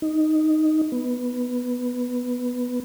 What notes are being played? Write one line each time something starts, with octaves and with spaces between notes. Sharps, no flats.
D#4
B3